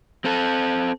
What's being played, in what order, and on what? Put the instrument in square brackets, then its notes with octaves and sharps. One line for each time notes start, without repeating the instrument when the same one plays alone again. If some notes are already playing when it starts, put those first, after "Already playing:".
[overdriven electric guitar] C4 A4